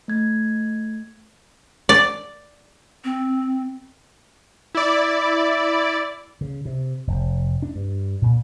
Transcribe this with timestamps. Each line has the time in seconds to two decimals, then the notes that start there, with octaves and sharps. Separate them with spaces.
0.08 A3 G#6
1.89 D5
3.04 C4
4.75 E4 D5
6.41 C#3
6.65 C3
7.07 F1
7.62 D4
7.75 G2
8.22 A#2